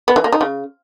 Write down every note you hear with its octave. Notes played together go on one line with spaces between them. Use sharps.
B3
E3
A#3
D#4
C#3